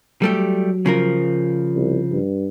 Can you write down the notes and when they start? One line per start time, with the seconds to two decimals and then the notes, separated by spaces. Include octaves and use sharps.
0.22 F#3 G3 A3 G4
0.86 C#3 F3 A#4
1.75 C2
2.11 G2